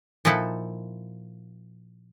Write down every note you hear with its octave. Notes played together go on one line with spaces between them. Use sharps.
A#2 F3 D#4 E4 A4 F#5